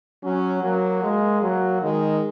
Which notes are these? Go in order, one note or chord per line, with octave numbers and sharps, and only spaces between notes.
F#3 C#4
F#3 A#3
G#3
F#3
D#3 G#3